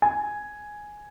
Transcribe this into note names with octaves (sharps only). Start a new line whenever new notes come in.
G#5